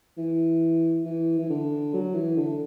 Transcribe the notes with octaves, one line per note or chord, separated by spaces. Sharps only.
E3
E3
E3
D3
F#3
E3
D3